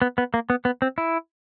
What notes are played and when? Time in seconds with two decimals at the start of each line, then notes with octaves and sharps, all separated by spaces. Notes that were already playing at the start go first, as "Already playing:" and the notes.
0.02 B3
0.18 B3
0.34 A#3
0.50 B3
0.65 B3
0.82 C4
0.98 E4